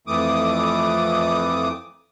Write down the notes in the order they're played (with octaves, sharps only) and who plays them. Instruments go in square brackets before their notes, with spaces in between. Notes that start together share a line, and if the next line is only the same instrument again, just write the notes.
[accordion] F2 E3 A3 D6 D#6